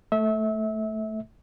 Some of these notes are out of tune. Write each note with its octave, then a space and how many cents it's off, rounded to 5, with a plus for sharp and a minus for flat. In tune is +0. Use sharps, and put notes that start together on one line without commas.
A3 +0 E5 -25